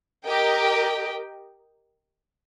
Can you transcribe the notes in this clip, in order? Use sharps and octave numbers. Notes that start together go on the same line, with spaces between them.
G4 A#4 D#5 G5